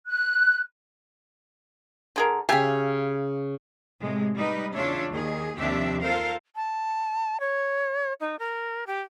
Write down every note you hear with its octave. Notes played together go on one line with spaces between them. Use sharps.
F#6
D3 G#4 A#4
C#3 G4 E5 F5 G#5
A2 C3 G#3
G3 D#4 B4
E2 C#3 D4 F4 C#5 E5
D#2 D#3 G#4
D#2 C3 F3 D4 G4 E5
F4 A4 A#4 C5 F5
A5
C#5
D#4
A#4
G4